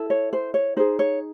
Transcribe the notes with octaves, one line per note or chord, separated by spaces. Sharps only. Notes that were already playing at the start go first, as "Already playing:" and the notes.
Already playing: E4 A4
C#5
C5
C#5
D#4 G#4 C5
C#5